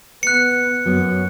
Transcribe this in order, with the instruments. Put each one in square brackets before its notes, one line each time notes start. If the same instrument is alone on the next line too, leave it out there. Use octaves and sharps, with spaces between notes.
[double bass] B3 [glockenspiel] F#6 C#7
[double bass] F#2 [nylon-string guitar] F#3 B3